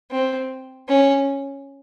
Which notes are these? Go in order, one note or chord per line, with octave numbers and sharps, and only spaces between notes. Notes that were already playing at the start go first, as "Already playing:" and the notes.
C4
C#4